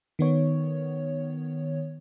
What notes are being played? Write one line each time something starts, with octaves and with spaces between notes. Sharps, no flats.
D#3 B3 C#5